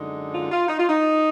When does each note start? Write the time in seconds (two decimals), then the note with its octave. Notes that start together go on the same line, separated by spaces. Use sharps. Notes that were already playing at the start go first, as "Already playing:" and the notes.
Already playing: F#2 D3 G#3 D#4
0.34 F4
0.51 F4
0.68 D#4
0.79 F4
0.89 D#4